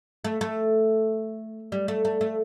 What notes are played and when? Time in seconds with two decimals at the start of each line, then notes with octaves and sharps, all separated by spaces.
0.24 A3
0.41 A3
1.72 G3
1.88 A3
2.05 A3
2.21 A3